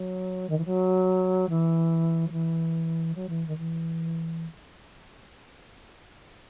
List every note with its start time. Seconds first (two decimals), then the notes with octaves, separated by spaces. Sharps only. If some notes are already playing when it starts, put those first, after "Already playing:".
Already playing: F#3
0.49 D#3
0.58 E3
0.65 F#3
1.49 E3
2.27 F#3
2.32 E3
3.15 F#3
3.29 E3
3.47 D#3
3.57 E3